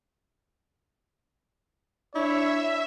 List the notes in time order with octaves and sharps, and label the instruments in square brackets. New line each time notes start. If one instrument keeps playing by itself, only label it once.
[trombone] D4 [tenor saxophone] E4 [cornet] C#5 [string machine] E5